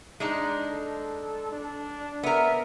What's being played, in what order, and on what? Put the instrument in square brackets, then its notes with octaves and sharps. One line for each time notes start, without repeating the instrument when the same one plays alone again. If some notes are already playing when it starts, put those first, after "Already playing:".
[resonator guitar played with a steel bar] G#3 D4 D#4
[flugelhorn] A4
D4
[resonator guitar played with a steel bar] B3 A#4 [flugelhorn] E5